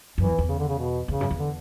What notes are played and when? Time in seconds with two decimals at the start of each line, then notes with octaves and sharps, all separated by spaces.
0.18 F#2 E3
0.28 E2
0.38 E2
0.49 C#3
0.59 D3
0.69 C#3
0.79 B2
1.08 E2 C#3
1.21 F#2
1.31 E2
1.39 D3